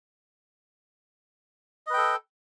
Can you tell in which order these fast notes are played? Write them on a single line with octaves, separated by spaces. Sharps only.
D#5 B4 G5 A4